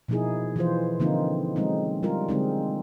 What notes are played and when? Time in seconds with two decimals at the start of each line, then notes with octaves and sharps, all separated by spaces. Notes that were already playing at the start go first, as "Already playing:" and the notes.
0.08 B2 F3 A#3 D#4 E4 G#4
0.56 E3 F3 F4 C5
1.00 D3 F3 A#3 C4 D#4 F4
1.56 F#3 G#3 C4 C#4 D#4
2.03 G3 F4 A#4
2.29 D3 G#3 C4 D#4